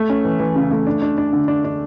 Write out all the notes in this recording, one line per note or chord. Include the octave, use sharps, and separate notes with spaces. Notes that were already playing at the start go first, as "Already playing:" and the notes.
Already playing: A3
C#4
E3
E3
C#3
A3
D4
D4
D4
D3
D4
D4